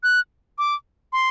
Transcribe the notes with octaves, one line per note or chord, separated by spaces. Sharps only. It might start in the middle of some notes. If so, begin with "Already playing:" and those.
F#6
D6
C6